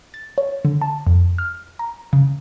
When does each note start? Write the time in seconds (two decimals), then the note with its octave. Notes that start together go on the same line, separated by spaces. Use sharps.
0.14 A6
0.38 C#5
0.65 D3
0.81 A5
1.07 F2
1.38 F6
1.79 A#5
2.13 C#3